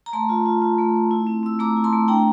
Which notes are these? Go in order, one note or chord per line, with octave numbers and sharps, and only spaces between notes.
A#5
A3 A5 C6
F4
F4
F4
A3
A3
E4
C4
C4 E6
A3 A#5 D6
E4
A5 C6
A3
D4 G5 A#5